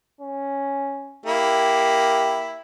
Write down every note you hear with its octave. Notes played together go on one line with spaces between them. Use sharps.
C#4
A#3 E4 G4